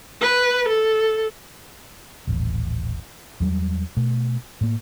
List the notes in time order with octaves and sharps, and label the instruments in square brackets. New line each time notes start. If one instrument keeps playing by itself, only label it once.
[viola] B4
A4
[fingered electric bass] D#1 A1
E2 F#3 G3
B2 A3
A2 A#3